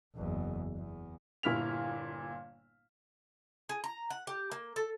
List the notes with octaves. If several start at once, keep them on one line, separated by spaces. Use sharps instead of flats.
F#1 E2
E2
G1 A#2 E4 F6 B6 F7
G#4
A#5
F#5
G4
A#3
A4